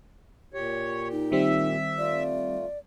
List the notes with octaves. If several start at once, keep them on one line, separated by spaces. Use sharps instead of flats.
A#2 G4 C#5
D#4
D#3 G3 C4 E5
A3 F4 D5